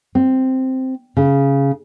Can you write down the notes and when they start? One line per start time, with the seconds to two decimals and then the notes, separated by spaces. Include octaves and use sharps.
0.15 C4
1.17 C#3